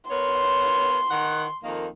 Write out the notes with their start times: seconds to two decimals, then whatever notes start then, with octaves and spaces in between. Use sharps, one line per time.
0.10 B3 A#4 C#5 C6
1.11 D#3 F#5
1.62 F2 D#3 A#3